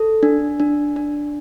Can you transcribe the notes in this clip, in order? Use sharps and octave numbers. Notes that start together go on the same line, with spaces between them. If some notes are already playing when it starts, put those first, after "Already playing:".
Already playing: A4
D4
D4
D4